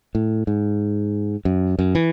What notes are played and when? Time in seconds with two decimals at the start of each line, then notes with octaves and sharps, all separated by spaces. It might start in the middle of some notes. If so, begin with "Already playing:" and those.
0.15 A2
0.47 G#2
1.45 F#2
1.79 F#2
1.95 E3